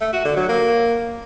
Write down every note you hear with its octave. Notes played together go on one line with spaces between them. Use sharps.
A3
F#4
D3
F#3
A#3